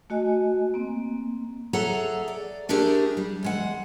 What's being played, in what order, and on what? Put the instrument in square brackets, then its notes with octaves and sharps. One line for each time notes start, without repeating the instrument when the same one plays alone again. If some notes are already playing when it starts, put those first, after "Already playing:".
[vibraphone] A3 F#4 D#5 G#5
A#3 C4
[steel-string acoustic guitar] G#4 A4 C#5 E5 F#5 A#5
D5
A3 D4 E4 G4 G#4 A#4
G3
E2 G#3 F#5